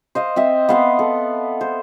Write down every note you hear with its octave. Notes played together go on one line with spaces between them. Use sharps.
C5 D#5 F5
C4 D#5 E5
B3 F5 C6
A4
C5